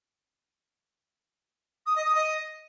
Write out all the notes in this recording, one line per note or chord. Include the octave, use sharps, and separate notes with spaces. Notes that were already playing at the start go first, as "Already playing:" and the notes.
D#6
D#5
D#6
D#5